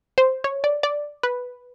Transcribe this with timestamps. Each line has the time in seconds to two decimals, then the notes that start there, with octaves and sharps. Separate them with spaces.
0.18 C5
0.44 C#5
0.64 D5
0.83 D5
1.23 B4